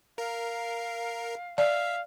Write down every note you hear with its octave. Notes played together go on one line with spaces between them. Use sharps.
A#4 F5
D5 E5 F5